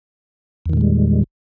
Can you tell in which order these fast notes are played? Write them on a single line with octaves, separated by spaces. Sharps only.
E2 D#3 A#2 G#3 G3